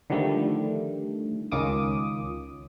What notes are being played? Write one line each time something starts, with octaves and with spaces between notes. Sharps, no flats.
D3 D#3 F3 G3 A3
C#2 D#3 C#4 F4 D6 D#6